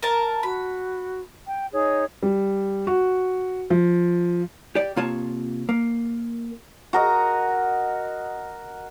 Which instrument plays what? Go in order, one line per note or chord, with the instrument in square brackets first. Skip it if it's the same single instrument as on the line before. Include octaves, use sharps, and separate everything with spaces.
[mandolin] A#4 A5
[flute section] F#4 [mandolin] B5
[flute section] G5
D#4 G#4 C#5
[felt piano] G3
F#4
F3
[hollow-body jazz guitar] G4 D5
C3 A#3 F4 C#5 A5
A#3
[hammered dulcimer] F#4 A#4 D#5